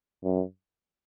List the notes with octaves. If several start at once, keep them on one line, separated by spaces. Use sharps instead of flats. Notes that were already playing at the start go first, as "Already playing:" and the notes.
F#2